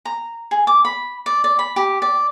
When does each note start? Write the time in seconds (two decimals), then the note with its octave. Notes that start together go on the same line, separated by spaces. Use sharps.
0.05 A#5
0.51 G#4
0.67 D6
0.85 B5
1.26 D5
1.44 D5
1.59 B5
1.76 G4
2.02 D5